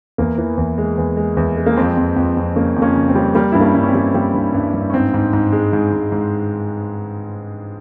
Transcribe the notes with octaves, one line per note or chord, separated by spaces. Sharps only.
E2 A#3
E3
E2
G#3
E2
G#3
E2
G#3
A#3
F2 C4
F2
F2
F2
C#3 A#3 C#4
F2
A#3 C#4
C#3
C4
G3
G3 A#3
G2 E4
A#3 C#4
G2
C#4
C4
G3
G3 A#3
G2
G2
G2
C#4
G#2 C4
G#2
G#2
G#3
G#2
G#2
G#2